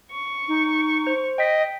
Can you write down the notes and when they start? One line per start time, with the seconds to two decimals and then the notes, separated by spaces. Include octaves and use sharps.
0.11 C#6
0.48 D#4
1.07 C5
1.38 D#5 G5 B6